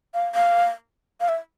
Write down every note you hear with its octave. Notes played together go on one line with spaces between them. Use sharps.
F5
F5
F5
E5